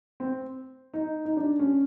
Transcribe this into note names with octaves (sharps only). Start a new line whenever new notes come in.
C4
D#4
D#4
D4
C#4